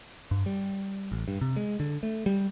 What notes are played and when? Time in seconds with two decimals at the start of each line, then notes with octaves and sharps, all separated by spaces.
0.31 G2
0.46 G3
1.12 A1
1.28 G2
1.41 C3
1.56 G#3
1.80 D3
2.03 A3
2.26 G3